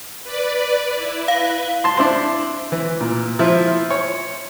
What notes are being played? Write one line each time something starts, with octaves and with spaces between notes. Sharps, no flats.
B4 D5
E4
B4 F5
A5 C6
D4 E4 C5
E3
A#2
F3 E4
C#5